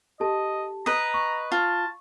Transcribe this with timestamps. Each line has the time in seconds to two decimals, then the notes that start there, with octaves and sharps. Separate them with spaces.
0.20 G4 A4 D#5 A5
0.86 B4 D#5 A#5 D#6
1.14 C#6
1.52 F4 A5